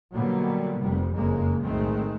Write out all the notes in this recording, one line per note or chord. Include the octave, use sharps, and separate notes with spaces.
B2 D3 F#3 G3 A#3 B3
F1 F2 C3 G3
F#1 F2 C#3 G#3 A#3
B1 A2 D#3 G#3 A3 C4